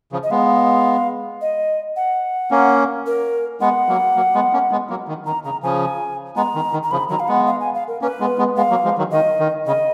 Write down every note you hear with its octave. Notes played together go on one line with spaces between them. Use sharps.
C#3 F3
D#5
G#3 B3 F5
D#5
F#5
A#3 C#4
A#4
G#3 B3 F#5
F#3 A#3
F#3 A#3
G#3 B3
A#3 C#4
G#3 B3
F#3 A#3
D#3
D#3 A#5
C#3 A#5
C#3 F3 G#5
G#3 B3 A#5
D#3
D#3
A#5
C#3 F3 B5
D#3 F#3 A#5
F5
G#3 B3 F#5
F5
G#5
F5
A#4
A#3 C#4 B4
G#3 B3
G#3 B3
G#3 B3 F5
F#3 A#3
F3 G#3
D#3 F#3
D#3 D#5
D#3
C#3 D#5